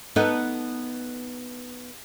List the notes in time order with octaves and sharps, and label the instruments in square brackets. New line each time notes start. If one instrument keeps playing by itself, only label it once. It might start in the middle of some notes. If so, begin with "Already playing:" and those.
[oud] B3 D#4 A4